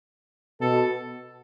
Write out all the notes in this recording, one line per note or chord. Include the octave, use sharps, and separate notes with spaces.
B2 A4